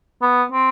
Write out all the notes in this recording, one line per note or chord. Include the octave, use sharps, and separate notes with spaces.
B3
C4